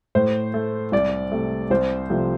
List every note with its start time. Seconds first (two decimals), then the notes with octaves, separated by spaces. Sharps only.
0.15 A2 C5
0.54 A3
0.92 C2 D5
1.32 C3 A3
1.71 C2 C5
2.10 C3 F3 A3